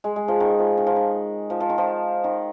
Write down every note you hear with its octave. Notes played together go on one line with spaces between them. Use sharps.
G#3
G#3
F3
D#3
F3
D#3
F3
D#3
F3
F3
D#3
F3
D#3